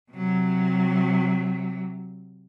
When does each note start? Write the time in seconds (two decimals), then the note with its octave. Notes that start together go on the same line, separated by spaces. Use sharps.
0.12 C3 F#3